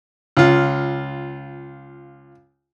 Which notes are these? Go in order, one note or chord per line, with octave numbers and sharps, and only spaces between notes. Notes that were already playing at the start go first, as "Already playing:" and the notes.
C#2 F4